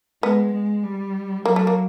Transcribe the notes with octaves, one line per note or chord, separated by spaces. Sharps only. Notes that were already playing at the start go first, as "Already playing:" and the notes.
G#3 B3
G#3
G3
F#3 A#3
A3
A#3